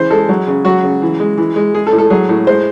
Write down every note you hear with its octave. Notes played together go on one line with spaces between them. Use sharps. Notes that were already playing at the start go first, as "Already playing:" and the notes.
Already playing: C#3 E3 C5
G#3 A4
F#3
C#3
F#3 F#4
C#3
E3
G#3
E3
G#3
G#3 G#4
A4
A2
A4
F#3 G#4
A2
G#3 C5